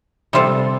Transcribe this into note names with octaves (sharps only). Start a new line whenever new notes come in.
C3 G3 C4 F4 A4